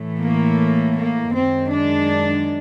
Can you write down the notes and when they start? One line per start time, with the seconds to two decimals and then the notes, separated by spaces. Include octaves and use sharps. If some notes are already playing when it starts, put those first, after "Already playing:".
Already playing: A2 E3 A3
0.19 A#3
0.95 A#3
1.32 F#2 D#3 G#3 C4
1.71 D4